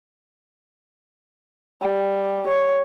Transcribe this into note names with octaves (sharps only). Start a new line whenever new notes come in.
G3
C#5